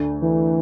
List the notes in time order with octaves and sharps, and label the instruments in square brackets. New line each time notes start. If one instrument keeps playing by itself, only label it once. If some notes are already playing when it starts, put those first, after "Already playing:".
Already playing: [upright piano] D2 D3 A3 D4
[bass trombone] E3